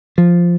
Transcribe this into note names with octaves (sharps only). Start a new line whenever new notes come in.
F3